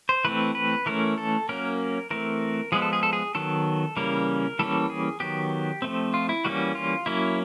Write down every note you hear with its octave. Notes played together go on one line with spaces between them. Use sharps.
C5
E3 A3 C4 B4
B4
E3 A3 C#4 A#4
A4
F#3 A#3 C#4 A#4
E3 A3 C4 A#4
F3 G#3 B3 G#4
A4
G#4
A4
G#4
D#3 F#3 B3 A4
C#3 E3 G3 A#3 C#4 A#4
E3 G3 A#3 C#4 A4
G#4
D#3 F#3 B3 G4
F3 A3 C4
F4
E4
E3 G3 A#3 C#4 F#4
F4
F#3 A#3 C#4 E4